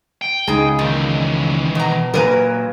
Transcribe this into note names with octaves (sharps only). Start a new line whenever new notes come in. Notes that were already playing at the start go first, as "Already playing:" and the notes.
G5
C#2 D#4 G#4
A#2 D#3 E3
B2 A#5
A#2 F#3 A#4 B4 A#5